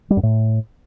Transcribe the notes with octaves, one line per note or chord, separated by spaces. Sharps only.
G3
F#2
A2